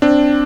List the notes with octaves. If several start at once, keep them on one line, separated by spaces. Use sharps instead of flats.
C4 D4